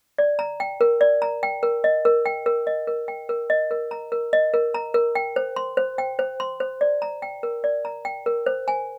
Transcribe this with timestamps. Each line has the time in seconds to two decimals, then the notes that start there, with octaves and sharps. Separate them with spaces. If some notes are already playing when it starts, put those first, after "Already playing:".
0.18 D5
0.39 A#5
0.60 G5
0.81 A#4
1.01 D5
1.22 A#5
1.43 G5
1.63 A#4
1.84 D#5
2.05 A#4
2.26 G5
2.46 A#4
2.67 D#5
2.87 A#4
3.08 G5
3.29 A#4
3.50 D#5
3.71 A#4
3.91 A#5
4.12 A#4
4.33 D#5
4.54 A#4
4.74 A#5
4.94 A#4
5.15 G5
5.36 C5
5.56 C6
5.77 C5
5.98 G5
6.19 C5
6.40 C6
6.60 C5
6.81 D5
7.02 A#5
7.22 G5
7.43 A#4
7.64 D5
7.85 A#5
8.05 G5
8.26 A#4
8.46 C5
8.68 G#5